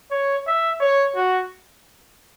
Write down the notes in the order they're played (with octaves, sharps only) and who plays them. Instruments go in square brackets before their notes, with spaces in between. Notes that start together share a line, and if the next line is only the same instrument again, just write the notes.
[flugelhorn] C#5
E5
C#5
F#4